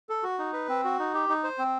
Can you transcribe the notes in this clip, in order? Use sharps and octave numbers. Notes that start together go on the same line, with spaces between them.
A4
F#4
D#4
B4
C4
F#4
D#4
G4
D#4
C5
C4